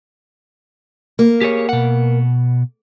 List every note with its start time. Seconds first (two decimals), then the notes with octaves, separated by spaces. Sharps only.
1.19 A#3
1.41 G4 G#4 C#5
1.69 B2 F#5